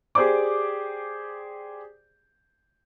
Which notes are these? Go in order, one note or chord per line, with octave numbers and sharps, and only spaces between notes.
G4 G#4 C5 D5 D6